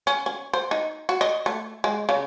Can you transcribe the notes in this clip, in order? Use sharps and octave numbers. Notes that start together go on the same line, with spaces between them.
C#4
C#4
C5
D#4
F#4
D#5
A3
G#3
C#3